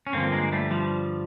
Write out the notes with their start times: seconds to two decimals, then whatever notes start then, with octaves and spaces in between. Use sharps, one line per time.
0.07 C#4
0.13 G2 D3 F3 A#3 C4
0.32 G#3 A#3
0.52 G3 A3
0.71 F3 G3